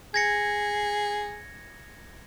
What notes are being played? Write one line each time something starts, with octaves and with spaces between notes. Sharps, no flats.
G#4 G#6 A#6 C#7